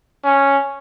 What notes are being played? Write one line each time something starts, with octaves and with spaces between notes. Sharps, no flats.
C#4